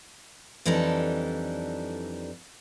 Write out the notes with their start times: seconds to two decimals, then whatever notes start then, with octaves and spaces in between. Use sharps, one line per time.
0.66 F2 E3 G3 D4 D#4 A4